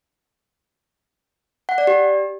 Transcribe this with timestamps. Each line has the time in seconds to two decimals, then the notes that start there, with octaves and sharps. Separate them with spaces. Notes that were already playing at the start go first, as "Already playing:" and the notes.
1.69 F#5
1.78 D5
1.87 G4